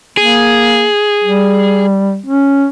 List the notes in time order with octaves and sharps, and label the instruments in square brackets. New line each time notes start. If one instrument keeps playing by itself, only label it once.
[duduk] A#3 [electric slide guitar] G#4
[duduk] G3
C#4